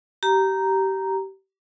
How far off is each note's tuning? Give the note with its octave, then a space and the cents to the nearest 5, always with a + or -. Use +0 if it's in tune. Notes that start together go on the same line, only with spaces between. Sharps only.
G4 -25 A#5 +0